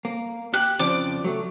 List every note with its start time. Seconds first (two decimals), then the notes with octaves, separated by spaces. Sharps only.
0.05 A#3
0.54 G4 F#6
0.79 F2 C#3 F3 D5 D6
1.24 F#3 A3